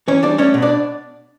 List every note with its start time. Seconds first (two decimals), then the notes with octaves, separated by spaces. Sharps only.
0.08 E3 C#4 C#5
0.23 G3 D4 D5
0.38 A3 C#4 C#5
0.54 B2
0.62 D4 D5